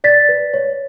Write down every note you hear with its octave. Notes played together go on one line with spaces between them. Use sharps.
D5 A6 B6
B4
C#5